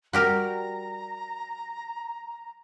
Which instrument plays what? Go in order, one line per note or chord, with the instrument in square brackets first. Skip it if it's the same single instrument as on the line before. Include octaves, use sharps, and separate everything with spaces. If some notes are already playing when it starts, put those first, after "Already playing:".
[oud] G3 [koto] F#4 G4 A#4 [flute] A#5